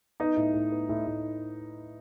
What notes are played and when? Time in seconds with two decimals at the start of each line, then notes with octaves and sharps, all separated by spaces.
0.20 B3 D#4 D#5
0.37 A2
0.54 A2
0.72 B3
0.89 A2
1.07 A2